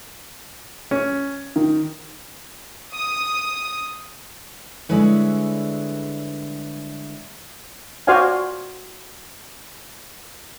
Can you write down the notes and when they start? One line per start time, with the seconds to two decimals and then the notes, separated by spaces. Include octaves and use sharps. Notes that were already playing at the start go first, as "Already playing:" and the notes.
0.91 C#4
1.56 D#3
2.92 D#6
4.89 D3 G3 G#3 E4 B4 C#5
8.07 F#4 C5 D5 F5 G#5